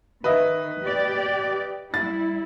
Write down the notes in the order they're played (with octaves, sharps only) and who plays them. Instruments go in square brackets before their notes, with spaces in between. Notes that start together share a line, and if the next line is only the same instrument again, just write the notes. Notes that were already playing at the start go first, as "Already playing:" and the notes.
[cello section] D#3 [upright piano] B4 D#5 E5
[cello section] G4 D5
[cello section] G3 E4 [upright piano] A6